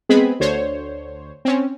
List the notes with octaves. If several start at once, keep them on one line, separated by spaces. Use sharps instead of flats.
G#3 B3 C4 G#4 B5
D2 D3 C5 C#5
C4 C#4